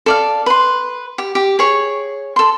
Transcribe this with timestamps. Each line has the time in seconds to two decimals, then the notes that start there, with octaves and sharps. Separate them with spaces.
0.06 A4 D5 F5
0.46 B4 C6
1.18 G4
1.35 G4
1.59 G#4 C#5
2.36 A4 C6